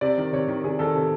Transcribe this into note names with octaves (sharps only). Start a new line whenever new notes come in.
C3 D5
D#3
C3 C#5
D#3
C3 G#4
D#3 A4
C3 A4